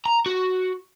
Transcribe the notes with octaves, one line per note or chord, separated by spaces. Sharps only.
A#5
F#4